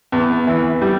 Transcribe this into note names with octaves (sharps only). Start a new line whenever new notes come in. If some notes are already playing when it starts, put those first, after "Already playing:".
E2
E3
G3